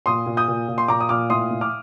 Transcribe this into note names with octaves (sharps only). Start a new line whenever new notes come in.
A#2 C6 D#6
A#2
D#6 G6
A#2
A#2
C6
A#2 A#5 D6
D#6
A#2 D6 F6
A2 C6 D#6
A2
D6 F6